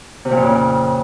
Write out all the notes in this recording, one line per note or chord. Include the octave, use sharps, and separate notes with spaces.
C3
A#2
F2
C#3